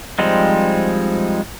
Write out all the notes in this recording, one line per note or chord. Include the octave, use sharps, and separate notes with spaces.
F3 G3 G#3 C4 D#4